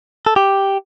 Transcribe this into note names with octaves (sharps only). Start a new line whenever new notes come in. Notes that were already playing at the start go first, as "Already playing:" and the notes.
A4
G4